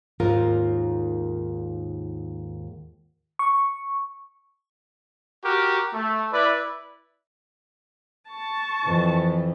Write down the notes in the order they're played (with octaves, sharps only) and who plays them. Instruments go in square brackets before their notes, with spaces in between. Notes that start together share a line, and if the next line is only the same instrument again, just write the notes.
[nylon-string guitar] D#2 G#2 A#3 F4 A#4
[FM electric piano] C#6
[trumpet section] F#4 G4 A#4
A3
E4 B4 D5
[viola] A5 C#6
[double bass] F2 E3